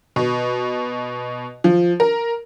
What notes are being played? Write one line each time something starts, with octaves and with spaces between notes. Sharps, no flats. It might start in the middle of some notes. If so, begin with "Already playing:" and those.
B2
F3
A#4